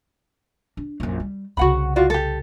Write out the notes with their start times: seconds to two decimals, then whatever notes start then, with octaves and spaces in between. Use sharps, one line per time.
0.77 D4
1.00 A#1 F#2
1.20 G3
1.57 C2 C#3 F#4 F#5 B5
1.96 F4 F#4 D5
2.10 G4 A4